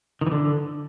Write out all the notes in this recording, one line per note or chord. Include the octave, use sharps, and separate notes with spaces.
D#3
E3
D3